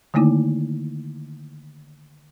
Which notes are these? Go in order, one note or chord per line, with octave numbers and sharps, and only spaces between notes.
D3 D#3 A3 A#3 D#4 E4